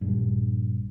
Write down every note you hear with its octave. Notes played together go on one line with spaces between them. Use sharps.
A#1 G2